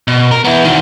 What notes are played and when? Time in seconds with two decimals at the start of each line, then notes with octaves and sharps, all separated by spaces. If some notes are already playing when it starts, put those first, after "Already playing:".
0.08 B2
0.31 A#4
0.45 B3 E4
0.65 D#3 F#4